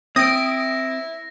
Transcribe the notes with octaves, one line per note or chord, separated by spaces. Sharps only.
C4 E4 D#6 A#6 D7